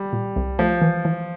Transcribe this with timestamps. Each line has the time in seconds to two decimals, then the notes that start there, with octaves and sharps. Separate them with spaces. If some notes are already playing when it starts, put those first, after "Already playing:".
Already playing: G3
0.13 A#2
0.36 C2
0.59 F3 A3
0.82 E3
1.05 E3